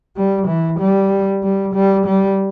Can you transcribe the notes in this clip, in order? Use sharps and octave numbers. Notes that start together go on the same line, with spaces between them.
G3
E3
G3
G3
G3
G3